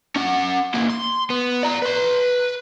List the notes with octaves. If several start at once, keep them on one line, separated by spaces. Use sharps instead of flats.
C#4 F#5
E3 A#3
C6
B3
D5 A#5
B4 C6